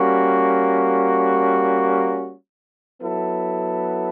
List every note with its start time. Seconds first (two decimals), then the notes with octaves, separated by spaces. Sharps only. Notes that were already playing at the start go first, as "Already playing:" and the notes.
Already playing: G3 A#3 C#4 F#4
3.01 F#3 B3 E4 A4